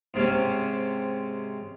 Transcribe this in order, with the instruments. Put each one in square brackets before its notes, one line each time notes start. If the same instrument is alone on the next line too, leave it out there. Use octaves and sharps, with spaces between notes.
[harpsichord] G#2 C3 C#4